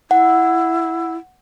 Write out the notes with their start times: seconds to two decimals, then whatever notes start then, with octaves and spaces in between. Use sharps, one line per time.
0.11 E4 F#5